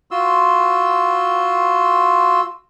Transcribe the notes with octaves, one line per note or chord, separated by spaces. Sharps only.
F4 F#4 C6 E6